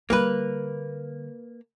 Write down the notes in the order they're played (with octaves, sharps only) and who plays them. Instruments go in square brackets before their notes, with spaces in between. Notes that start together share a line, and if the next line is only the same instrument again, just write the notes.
[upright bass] D3 G3 [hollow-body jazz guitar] A#3 B4